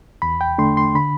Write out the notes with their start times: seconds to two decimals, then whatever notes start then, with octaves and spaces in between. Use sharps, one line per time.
0.22 E2 B5
0.41 G5
0.58 D3 A3 D4 C6
0.77 C6
0.95 D3 B5